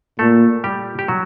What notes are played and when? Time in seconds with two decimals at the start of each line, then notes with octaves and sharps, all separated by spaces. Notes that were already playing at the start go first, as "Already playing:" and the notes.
0.19 A#2 A3 A4
0.64 G3 G4
0.99 G4
1.08 F#3 F#4